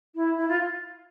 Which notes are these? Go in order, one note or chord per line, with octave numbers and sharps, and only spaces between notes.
E4
E4
F4